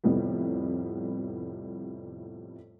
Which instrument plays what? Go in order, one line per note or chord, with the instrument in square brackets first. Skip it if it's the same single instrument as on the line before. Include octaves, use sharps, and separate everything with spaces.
[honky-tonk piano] F2 A2 C3 G3 B3